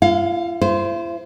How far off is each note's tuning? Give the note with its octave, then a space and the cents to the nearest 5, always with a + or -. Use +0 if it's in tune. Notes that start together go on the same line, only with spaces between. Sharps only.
F4 -45 F5 +25
E4 +45 C5 -5